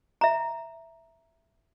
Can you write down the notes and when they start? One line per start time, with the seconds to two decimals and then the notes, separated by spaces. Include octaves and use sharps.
0.21 E5 A#5